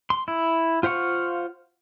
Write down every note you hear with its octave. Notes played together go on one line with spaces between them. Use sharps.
C6
E4
F4 C5 F5 F#5 C#6